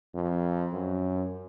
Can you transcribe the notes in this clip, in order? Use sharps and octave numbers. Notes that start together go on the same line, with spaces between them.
F2
F#2